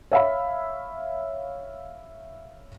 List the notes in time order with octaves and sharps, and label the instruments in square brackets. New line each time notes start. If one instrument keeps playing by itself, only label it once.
[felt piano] C#5 E5 F5 B5